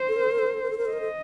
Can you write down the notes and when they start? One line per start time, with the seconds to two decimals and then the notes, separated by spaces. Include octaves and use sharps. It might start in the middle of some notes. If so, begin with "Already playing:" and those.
Already playing: C5
0.08 A4
0.16 A#4
0.24 A4
0.31 A#4
0.39 A4
0.46 A#4
0.54 A4
0.63 A#4
0.70 A4
0.78 A#4
0.85 A4
0.91 A#4 D#5
1.01 A4